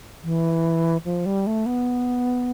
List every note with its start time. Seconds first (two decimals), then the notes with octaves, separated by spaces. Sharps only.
0.24 E3
1.05 F3
1.26 G3
1.47 A3
1.66 B3